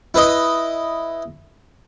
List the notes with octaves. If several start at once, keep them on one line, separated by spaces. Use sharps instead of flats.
E4 B4 D#5